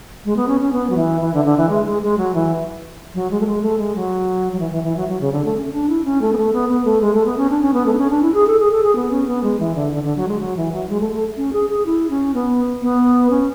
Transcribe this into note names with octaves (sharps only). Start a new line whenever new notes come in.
G#3
B3
C#4
C#4
B3
F#3
E3
E3
D3
D3
E3
G#3
G#3
G#3
F#3
E3
F#3
G#3
A3
G#3
A3
G#3
F#3
F#3
E3
E3
E3
F#3
F#3
C#3
D3
A3
C#4
D4
E4
C#4
A3
B3
A3
B3
B3
A3
G#3
A3
B3
C#4
D4
C#4
B3
A3
D4
C#4
D4
E4
G#4
A4
G#4
A4
G#4
B3
C#4
B3
G#3
E3
D3
D3
D3
F#3
G#3
F#3
E3
F#3
G#3
A3
A3
C#4
G#4
G#4
E4
C#4
B3
B3
C#4